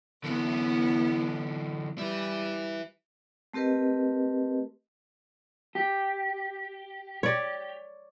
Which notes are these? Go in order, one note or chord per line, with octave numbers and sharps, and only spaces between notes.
D3 E3 B3 C#4 E4
G3 E4 B4
A3 C4 G4 A#4 B4 D#5
G4
C#5 D5